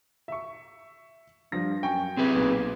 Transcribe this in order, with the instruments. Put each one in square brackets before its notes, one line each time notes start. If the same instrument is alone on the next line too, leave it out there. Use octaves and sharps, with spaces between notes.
[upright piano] E5 C#6
[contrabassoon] G2 [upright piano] F3 A#6
[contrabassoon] F#2 [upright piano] G5 G#5 C#6
[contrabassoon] C3 [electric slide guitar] C4 G#4 B4
[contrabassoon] B1 [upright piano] A#2